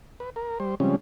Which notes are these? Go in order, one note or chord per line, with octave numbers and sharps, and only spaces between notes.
B4
A#4
G3 C5
C#3 F3 G3 G#3 C4 C#4